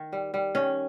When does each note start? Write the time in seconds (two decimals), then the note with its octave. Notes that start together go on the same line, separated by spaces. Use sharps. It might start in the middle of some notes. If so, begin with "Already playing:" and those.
Already playing: D#3
0.13 G3
0.34 G3
0.55 D#3 C#4